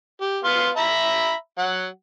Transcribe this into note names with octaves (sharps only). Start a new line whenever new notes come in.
G4
B3 F5 C6
E5 A#5 B5
F#3 F#5